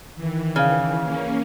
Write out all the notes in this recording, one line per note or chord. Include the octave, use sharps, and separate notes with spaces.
D#3 E3
C#3 F5 F6
A#3 C#4